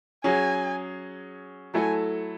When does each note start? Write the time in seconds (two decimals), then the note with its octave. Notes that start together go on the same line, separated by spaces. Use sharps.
0.24 F#3 C#4 G#4 G#5
1.74 F#3 A3 E4 A4 G#5